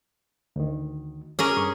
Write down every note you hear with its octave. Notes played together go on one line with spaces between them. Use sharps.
D2 D#3
C#4 G#4 A#4 D6
G2 C#6 D#6